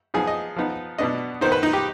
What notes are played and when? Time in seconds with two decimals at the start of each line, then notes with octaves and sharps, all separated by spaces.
0.14 F3 B3 D#4 G#4
0.27 D#5
0.56 F3 B3 D#4
0.98 B2 B3 D4 D#5
1.41 D#3 B3 D#4 C5
1.52 B4
1.63 D#4
1.73 G4